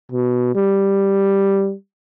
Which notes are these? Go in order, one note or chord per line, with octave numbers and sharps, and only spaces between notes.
B2
G3